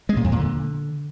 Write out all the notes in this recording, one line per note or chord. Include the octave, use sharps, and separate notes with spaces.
G#3
A#2
F2
A#2
D3